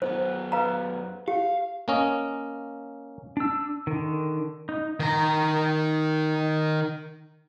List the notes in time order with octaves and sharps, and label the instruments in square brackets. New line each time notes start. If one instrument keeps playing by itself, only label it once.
[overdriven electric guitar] F#2 B3 [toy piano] C5
[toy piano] B4 F5 A#5
[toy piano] G4 [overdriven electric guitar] F5
[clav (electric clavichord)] A#3 C#4 D#5
[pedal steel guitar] D4 E6
D3 D#3
D#4
[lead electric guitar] D#3 A#5